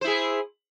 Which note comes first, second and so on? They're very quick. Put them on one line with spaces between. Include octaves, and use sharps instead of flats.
C5 E4 G#4